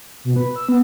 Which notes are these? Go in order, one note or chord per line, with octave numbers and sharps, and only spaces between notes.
B2
B4
E6
B3